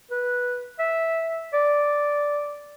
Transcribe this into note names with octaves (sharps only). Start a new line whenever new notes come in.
B4
E5
D5